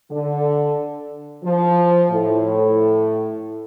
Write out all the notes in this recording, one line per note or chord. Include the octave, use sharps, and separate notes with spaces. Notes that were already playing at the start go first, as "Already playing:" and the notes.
D3
F3
A2